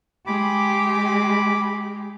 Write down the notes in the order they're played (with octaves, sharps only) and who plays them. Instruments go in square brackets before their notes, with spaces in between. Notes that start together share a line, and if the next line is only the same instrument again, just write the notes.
[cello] G#3 G4 [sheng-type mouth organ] B5 D6